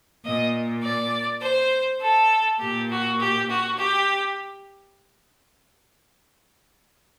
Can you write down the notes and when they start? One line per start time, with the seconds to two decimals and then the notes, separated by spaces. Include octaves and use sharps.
0.25 A#2 D#5
0.83 D5
1.42 C5
2.02 A4
2.60 A#2 G4
2.90 F#4
3.20 G4
3.49 F#4
3.79 G4